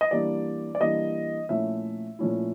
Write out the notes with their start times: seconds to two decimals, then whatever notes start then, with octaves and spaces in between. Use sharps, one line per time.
0.01 D#5
0.11 E3 G3 A#3 D4 D5
0.75 D5
0.80 E3 G3 A#3 D4 D#5
1.49 A#2 F3 A3 C#4 E4 E5
2.19 A#2 F3 A3 C#4 E4